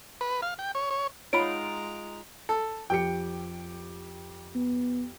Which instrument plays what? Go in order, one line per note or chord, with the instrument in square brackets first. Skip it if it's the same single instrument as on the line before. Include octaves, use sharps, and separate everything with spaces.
[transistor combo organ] B4
F5
G5
C#5
C#5
[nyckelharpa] G#3 A#5 [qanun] D#4 F4 F#5 [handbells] C#5 B5 [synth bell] D7
[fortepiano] A4
[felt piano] F2 G4 C#7 [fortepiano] G5
[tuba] B3